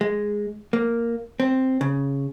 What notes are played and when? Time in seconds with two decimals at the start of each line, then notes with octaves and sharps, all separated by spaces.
0.01 G#3
0.73 A#3
1.40 C4
1.81 C#3